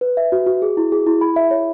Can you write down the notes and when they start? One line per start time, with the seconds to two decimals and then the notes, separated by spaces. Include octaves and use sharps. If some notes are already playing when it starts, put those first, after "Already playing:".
0.01 B4
0.17 E5
0.32 F#4
0.46 F#4
0.62 G#4
0.77 E4
0.92 G#4
1.07 E4
1.21 B5
1.36 E5
1.51 C#5